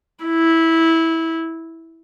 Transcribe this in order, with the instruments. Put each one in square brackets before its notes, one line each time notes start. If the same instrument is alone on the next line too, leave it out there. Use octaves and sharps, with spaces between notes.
[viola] E4